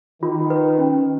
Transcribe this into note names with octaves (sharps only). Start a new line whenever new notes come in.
D#3 F4
B4
C#4